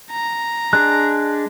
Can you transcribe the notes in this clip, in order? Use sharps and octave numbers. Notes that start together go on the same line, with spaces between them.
A#5
G#3 D4 F#6